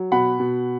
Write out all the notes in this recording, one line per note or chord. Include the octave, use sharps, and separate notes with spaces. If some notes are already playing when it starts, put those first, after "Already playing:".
Already playing: F#3
B2 F#5 B5
B2